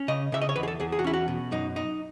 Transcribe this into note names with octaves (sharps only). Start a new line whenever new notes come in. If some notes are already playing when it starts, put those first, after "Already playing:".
Already playing: C#4
C#3 D#5
C#3 E5
D#5
C#5
E2 B4
G#4
A4
E2 G#4
G#4
F#4
C#4 E4
F#4
B2
F#2 D#4
D#4